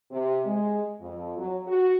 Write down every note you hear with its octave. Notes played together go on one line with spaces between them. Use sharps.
C3
G#3
F2
F#3
F#4